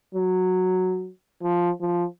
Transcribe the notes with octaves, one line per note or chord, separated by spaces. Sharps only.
F#3
F3
F3